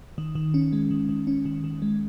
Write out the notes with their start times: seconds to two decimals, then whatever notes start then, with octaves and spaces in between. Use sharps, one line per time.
0.18 D#3
0.35 D#3
0.54 C#4
0.73 G#3
0.91 D#3
1.09 D#3
1.27 C#4
1.45 D#3
1.64 D#3
1.82 G#3